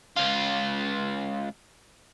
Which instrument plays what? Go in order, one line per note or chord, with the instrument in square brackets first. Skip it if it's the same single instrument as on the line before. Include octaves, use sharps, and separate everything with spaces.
[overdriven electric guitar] C#2 F4